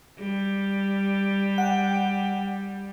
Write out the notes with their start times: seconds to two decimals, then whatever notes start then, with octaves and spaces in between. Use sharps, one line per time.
0.19 G3
1.58 F#5 G5